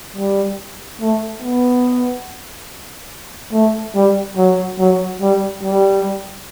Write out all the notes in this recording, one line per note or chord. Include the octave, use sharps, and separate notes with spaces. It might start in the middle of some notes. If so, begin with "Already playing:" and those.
G3
A3
B3
A3
G3
F#3
F#3
G3
G3